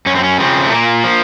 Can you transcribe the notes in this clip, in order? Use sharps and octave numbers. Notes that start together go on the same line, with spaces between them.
F#2 C#4
C4
C#4
C#3 F3 C4
A3
A#2 A#3
F3